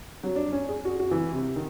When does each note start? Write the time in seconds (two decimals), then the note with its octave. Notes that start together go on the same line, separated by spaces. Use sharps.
0.23 F#3
0.36 D4
0.52 C#4
0.69 G#4
0.85 F#4
1.00 F#4
1.11 E3
1.33 C3
1.56 D#3